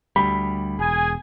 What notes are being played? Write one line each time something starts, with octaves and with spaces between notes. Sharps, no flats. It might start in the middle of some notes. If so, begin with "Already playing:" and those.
D2 G3 B5
E1 G#4 G#5